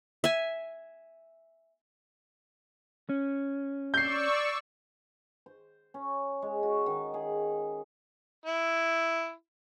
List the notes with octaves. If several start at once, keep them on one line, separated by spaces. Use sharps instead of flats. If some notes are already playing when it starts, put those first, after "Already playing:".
E5 G#5
C#4
D5 C#6 E6 G6 C7
C5
C#4
G#3
F#4
D#3
G#4
E4